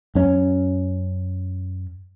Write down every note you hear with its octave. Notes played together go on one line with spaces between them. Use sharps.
F#2 C#4